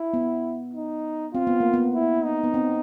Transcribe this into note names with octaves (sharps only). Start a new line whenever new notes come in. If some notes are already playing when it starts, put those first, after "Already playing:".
Already playing: E4
B3
D#4
C4 F4
B3
A#3
B3
E4
D#4
B3
C4